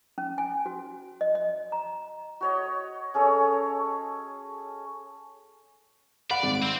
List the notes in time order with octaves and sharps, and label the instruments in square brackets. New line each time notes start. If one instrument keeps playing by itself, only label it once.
[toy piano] C#4
G#5
F#4
D#5
D#5
A#5
[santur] F#4 C#5 D#5
C#4 G#4 A4 C#5
[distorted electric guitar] D5 [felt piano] F5 F#5 B5
[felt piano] G#1
[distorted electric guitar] C4